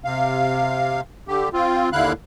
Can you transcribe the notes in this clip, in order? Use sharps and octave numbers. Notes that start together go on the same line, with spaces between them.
C3 F5
D3 G4
C4 F4
D#2 D3 E4 F5 F#6